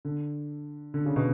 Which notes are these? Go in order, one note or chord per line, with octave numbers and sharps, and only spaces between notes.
D3
D3
C#3
B2